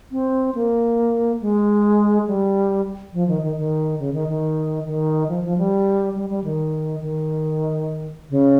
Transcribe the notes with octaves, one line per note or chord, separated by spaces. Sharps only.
C4
A#3
G#3
G3
F3
D#3
D#3
D#3
C#3
D#3
D#3
D#3
F3
F3
G3
G3
G3
D#3
D#3
C#3